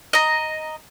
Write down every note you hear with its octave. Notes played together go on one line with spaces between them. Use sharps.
D#5 A#5